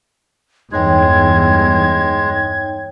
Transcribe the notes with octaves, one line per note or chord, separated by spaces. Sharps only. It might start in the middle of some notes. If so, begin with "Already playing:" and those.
E2 G2 G#3 D#4 C#5 G5 G#6